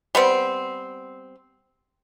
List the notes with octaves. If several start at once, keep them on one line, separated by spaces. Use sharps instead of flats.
G3 B3 C4